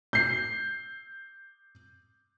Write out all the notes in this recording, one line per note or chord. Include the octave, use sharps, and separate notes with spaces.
G6 C7